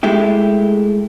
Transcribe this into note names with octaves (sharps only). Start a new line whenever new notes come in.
G#3 A3 E4 G4